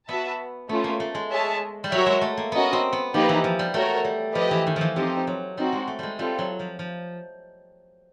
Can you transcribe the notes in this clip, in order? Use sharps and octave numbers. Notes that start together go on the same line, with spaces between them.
B3 F#4 B4 E5 A5
A3 B3 C#4 F4
A#3
A3
G#3
G#4 C#5 E5 A5
G3
F#3 F#4 A#4 C#5 E5
G#3
A3
A#3
B3 C#4 F#4 A#4 D#5
C4
B3
F3 A#3 D#4 G4 B4
E3
F3
G3
A3 F#4 A#4 C#5
G3
F3 G4 B4 D#5 G5
E3
D#3
E3 F3
F3 C4 D#4 G4
F#3
G3 C4 D#4 F#4
G#3
A3
G3 G#3
G3 C4 F4 A4
F#3
F3
F3